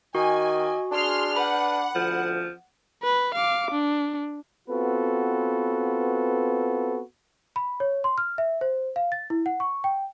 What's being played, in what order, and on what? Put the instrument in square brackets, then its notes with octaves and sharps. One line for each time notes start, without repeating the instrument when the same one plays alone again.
[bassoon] D#3 [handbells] F#4 [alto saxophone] D#5 [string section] G#5
[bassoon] D4 [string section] G#4 C6 F6
[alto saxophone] B4 [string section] F#5 [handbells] B5
[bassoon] D2 [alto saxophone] F3
[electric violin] B4
F5 D6
D4
[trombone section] B3 C4 F4 F#4 A4 B4
[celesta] B5
C#5
C6
F6
E5
C5
F5
A6
E4
F#5
C#6
G5